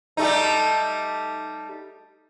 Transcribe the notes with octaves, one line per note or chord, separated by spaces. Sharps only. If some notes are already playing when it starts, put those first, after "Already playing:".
G3 A3 D#4